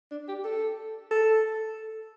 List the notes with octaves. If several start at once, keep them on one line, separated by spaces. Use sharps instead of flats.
D4
G4
A4
A4